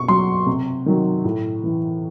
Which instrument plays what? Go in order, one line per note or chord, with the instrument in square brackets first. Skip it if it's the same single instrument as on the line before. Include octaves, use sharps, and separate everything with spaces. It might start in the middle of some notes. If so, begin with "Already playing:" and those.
Already playing: [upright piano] B2 C#6
F#3 C6
C3
D#3 F#3
A2
E3